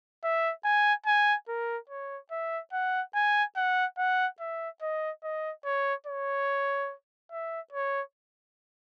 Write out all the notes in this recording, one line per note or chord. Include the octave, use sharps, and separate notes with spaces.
E5
G#5
G#5
A#4
C#5
E5
F#5
G#5
F#5
F#5
E5
D#5
D#5
C#5
C#5
E5
C#5